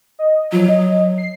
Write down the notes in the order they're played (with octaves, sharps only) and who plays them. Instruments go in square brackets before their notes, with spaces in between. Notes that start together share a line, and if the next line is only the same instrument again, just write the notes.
[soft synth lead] D#5
[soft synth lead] F3 [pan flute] F#3
[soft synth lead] D#5
C7